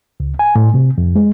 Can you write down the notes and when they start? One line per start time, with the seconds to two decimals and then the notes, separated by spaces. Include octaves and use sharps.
0.20 C#2
0.39 G#5
0.55 A2
0.74 C3
0.98 F2
1.16 G#3